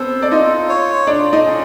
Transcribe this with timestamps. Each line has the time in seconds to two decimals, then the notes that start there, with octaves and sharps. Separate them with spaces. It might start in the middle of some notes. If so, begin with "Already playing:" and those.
Already playing: B3 C4 A4 C5
0.22 D5
0.31 D#4 F4 D#5
0.69 C#5
1.07 D4 F4 D5
1.33 D#4 D#5
1.45 C#4